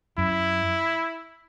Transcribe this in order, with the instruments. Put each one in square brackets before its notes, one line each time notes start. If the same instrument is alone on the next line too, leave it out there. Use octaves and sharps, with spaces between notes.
[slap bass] F#2 [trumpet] E4